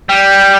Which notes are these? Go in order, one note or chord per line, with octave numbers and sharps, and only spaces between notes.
G3